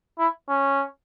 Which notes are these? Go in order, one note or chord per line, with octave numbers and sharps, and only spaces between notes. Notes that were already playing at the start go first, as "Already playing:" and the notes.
E4
C#4